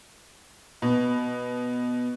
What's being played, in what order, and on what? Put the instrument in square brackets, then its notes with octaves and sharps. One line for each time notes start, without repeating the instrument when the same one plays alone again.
[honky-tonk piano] B2